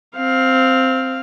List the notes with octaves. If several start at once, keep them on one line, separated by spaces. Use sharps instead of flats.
C4 F5